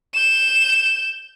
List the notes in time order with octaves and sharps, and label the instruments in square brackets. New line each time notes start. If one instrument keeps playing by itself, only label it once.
[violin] G6 E7